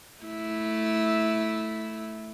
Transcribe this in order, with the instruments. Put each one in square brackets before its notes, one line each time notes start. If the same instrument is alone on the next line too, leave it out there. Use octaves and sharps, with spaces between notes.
[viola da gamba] A3 E4